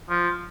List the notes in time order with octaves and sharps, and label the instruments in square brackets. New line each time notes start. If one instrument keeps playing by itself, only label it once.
[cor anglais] F3